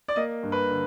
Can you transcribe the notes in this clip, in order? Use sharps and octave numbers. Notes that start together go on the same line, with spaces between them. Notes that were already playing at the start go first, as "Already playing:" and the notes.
D5
A#3 D#5
G2
B4
D3